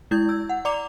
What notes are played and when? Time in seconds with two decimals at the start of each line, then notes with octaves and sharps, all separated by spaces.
0.11 G#3 E4 G6 G#6
0.29 E6
0.49 F#5
0.65 D5 A#5 D6 F7